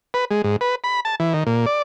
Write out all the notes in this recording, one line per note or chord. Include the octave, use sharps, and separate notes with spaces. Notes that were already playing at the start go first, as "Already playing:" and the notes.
B4
G#3
G#2
B4
B5
A5
E3
D#3
A#2
D5